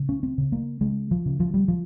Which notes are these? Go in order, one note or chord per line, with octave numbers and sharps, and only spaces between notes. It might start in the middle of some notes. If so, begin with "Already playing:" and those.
Already playing: C#3
C#4
C4
C#3
A#3
C#3 G#3
F3
C#3
F3
G3
F3